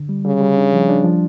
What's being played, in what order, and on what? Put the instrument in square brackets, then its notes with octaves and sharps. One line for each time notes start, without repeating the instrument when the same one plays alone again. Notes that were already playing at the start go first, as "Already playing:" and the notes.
Already playing: [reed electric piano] D3
G3
[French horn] C#3 [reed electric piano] G3
[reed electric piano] G3
D4
F3
D4
F3